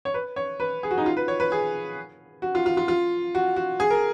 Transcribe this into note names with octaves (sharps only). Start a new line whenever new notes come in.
C#5
B4
C#5
B4
G#4
F#4
D#4
F4
B4
C#5
B4
G#4
F#4
F4
F4
F4
F4
F#4
F#4
G#4
A#4